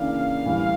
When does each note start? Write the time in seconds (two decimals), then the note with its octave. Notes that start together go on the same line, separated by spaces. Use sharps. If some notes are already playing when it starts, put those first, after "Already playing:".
Already playing: C#3 E3 A#3 D4 F5
0.45 A2 E3 G3